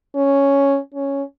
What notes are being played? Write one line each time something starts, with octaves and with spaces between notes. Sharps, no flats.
C#4
C#4